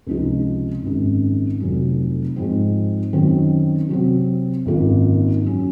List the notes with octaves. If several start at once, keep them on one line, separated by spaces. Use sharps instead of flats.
C#2 C3 F3 G#3 D#4
G#1 F#2 C#3 G#3
F1 F2 C#3 F#3 C#4
G#2 F3 C4
F#2 D#3 F#3 C4
C3 F#3 C4
G#1 F#2 D#3 A#3 F4
F#2 C#3 F#3 C#4